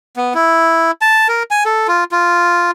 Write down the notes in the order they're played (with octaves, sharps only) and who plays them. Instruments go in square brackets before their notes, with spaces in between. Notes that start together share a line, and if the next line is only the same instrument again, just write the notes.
[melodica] B3
E4
A5
A#4
G#5
A4
F4
F4